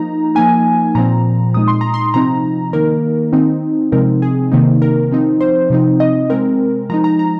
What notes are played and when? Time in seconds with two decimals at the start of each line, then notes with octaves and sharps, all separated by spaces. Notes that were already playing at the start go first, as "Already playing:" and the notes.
Already playing: F3 A#3 D#4 A#5
0.35 F3 A#3 D#4 G#5
0.95 A#2 F3 C4 A#5
1.54 A#2 G#3 D#4 D#6
1.68 C6
1.81 A#5
1.94 C6
2.14 C3 F3 C4 D#4 A#5
2.73 D#3 A#3 D#4 A#4
3.33 D#3 C4 D#4
3.92 C3 F3 G#3 C4 D#4 A#4
4.22 G#4
4.52 C3 D#3 A#3 D#4
4.82 A#4
5.11 F3 C4 D#4
5.41 C5
5.70 C3 F3 C4 D#4
6.00 D#5
6.30 C3 G#3 C4 A#4
6.90 F3 G#3 D#4 A#5
7.04 A#5
7.19 A#5